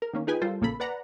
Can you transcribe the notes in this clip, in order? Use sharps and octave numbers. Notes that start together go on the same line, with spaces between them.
A#4
D#3 A#3 C#4
D#4 F4 G#4 B4 G5 G#5
G3 F4 A4 A#4 C5
A#1 C#3 A#3 A4 B5
B4 D5 F#5 A#5 B5